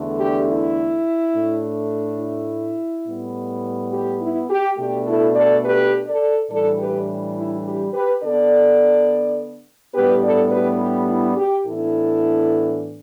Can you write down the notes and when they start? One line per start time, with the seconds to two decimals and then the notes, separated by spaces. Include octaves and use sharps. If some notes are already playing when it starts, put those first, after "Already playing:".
Already playing: E2 D3 A3 D4
0.20 G4
0.49 E4
1.34 A2 A3 D4
2.20 E4
3.07 A2 G3 B3
3.93 G4
4.21 E4
4.49 G4
4.78 B2 A3 D4 G4
5.07 E4 A4
5.35 A4 D5
5.64 G4 B4
6.07 A4 D5
6.50 A2 E3 G3 D4 A4 D5
6.79 G4 B4
7.36 E4
7.65 G4
7.93 G4 B4
8.22 D3 B3 D4 A4 D5
9.94 A2 G3 B3 D4 G4 B4
10.23 A4 D5
10.51 G4 B4
10.80 G4
11.09 E4
11.37 G4
11.66 A2 E3 B3 D4 E4 A4